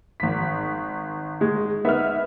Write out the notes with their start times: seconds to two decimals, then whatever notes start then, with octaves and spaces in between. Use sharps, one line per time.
0.20 G#1 B6
1.41 G#3
1.85 B3 D#4 E5 F6